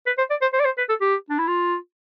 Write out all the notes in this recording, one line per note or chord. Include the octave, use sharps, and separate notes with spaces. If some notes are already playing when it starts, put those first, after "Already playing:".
B4
C5
D5
C5
C5
D5
C5
B4
A4
G4
D4
E4
F4